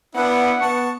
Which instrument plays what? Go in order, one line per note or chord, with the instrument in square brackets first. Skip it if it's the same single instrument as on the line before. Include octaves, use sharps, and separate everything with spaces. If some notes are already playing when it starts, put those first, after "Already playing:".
[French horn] B3 [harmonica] D4 E4 [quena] F#5
[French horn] B3 [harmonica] A5 C#6